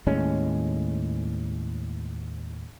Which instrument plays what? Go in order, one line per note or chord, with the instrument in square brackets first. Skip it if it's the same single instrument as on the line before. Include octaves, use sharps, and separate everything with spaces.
[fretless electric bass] D#2 A2 G#3 C#4